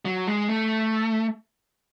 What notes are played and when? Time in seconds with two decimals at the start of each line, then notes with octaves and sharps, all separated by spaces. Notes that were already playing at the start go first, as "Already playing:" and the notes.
0.05 F#3
0.27 G#3
0.48 A3